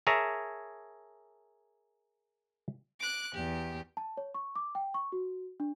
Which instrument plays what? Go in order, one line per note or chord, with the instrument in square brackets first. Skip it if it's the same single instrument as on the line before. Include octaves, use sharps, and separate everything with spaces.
[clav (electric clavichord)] G#4 A#4 C#5 E5 A5 A#5
[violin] D6 F#6
[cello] E2 [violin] G4
[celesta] A5
C#5
C#6
D6
G5
C#6
F#4
D4